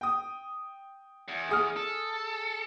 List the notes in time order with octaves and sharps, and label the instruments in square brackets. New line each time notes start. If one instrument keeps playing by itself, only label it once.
[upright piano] G5 D#6
[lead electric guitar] E2
[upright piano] G#4 D#6 F6
[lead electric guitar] A4